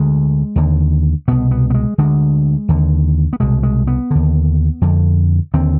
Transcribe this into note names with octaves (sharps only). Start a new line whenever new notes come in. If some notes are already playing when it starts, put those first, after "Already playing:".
Already playing: D2 D3 G#3
D#2 D3
C2 B2 B3
B3
B3
G#3
D2 D3 G#3
D#2 D3
B3
C2 B2 G#3
G#3
B3
D#2 D3
F2 D3
D#2 D3 C4